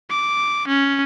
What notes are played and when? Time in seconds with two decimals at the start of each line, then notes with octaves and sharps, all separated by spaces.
0.10 D6
0.68 C#4